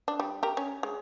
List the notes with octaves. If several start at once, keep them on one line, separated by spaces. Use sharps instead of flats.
D4
G3
G4 A#4
C#4
G#3